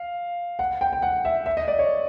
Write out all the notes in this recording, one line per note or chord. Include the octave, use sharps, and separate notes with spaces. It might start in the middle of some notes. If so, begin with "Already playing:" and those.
Already playing: F5
F#5
G5
G5
F#5
E5
E5
D#5
D5
C#5